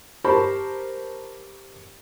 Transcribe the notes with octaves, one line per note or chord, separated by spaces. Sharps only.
G4 A#4 C5 A5 B5 C#6